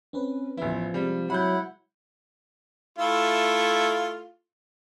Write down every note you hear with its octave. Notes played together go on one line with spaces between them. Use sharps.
C4 C#4 B4
A1 F3 B3 E4
C3 G3 G#3 C4
F#3 E4 F#5 B5 G6
A3 E4 F4